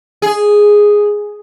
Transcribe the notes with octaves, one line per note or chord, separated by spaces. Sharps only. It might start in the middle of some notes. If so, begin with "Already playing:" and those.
G#4